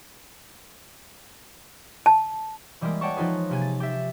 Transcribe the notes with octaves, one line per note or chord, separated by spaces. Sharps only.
A5
E3 G3 G#3 A#3 A#4
C#5 D5 F#5 G5 A5 C#6
F3 D#4 F4 G#4 B4
C3 A#3 G#5 G#6
A6
G4 E5